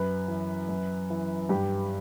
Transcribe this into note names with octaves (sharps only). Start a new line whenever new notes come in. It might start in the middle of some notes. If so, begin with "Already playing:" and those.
Already playing: F#2 B4
E3
F#2
E3
G2 G4